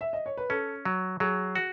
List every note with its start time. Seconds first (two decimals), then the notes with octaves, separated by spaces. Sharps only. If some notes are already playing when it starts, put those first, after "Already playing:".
0.01 E5
0.13 D#5
0.26 C#5
0.37 B4
0.50 C#4 A4
0.85 F#3
1.20 F#3 G#4
1.56 F#4